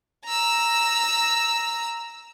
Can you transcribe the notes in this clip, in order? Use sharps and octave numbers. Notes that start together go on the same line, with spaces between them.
A#5 E6